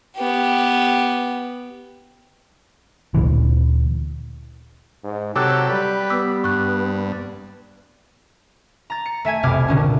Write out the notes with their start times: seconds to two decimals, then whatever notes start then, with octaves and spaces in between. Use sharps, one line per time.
0.18 B3 G4
3.14 D2 A#2 E3
5.04 G#2
5.36 C3 F#3 G4 A4 D6 E6 F#6
5.69 G3 G4 B4
6.10 B3 D6 E6 B6
6.44 G2 C#6 F#6
8.90 A#5 A6
9.06 C#7
9.25 A3 E5 G#5 G#6
9.43 F1 C2 B2 D6 F6 G#6
9.68 A#2 D3 C#4